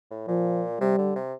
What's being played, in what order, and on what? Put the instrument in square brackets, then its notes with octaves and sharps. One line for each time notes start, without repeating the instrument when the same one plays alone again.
[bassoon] A2
[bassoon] A#2 [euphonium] F3
[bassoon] C3 [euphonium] G3
[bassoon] D3
C3